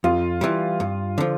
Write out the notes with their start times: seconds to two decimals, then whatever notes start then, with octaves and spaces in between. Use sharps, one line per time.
0.04 F2 F4
0.41 E3 G3
0.80 G2
1.18 D3 F3